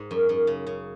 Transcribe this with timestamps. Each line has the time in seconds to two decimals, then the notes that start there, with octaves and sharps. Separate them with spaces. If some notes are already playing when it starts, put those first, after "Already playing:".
Already playing: G#2
0.11 F#2
0.29 F#2
0.47 C#3
0.67 C#3